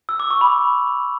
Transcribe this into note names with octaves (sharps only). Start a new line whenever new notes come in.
E6
D6
C#6
B5